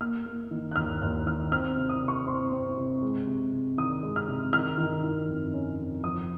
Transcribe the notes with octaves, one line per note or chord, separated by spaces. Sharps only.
A#3 F6
A#3
D#3
F#6
D#2 F6
D#2 F#6
D#3 F6
C4 F6
C3
D#6
C3
C#6
C4 C6
C4
C3
G#3
C3
C3
D#3 D#6
G#3
F6
C3
D#3 F6
D#3
D#3
F2
C#4
F2
F3 D#6